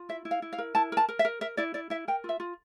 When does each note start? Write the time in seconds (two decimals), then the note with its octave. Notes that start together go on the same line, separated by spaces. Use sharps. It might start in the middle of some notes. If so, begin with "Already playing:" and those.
Already playing: F4
0.09 E4 E5
0.25 E4
0.31 F5
0.42 E4
0.53 F5
0.58 A#4
0.75 E4 A5
0.92 A#4 A5
1.09 A#4
1.19 E5
1.25 A#4
1.41 A#4 E5
1.57 E4 D5
1.74 E4 D5
1.90 E4 E5
2.08 A#4 G5
2.24 F4
2.29 E5
2.40 F4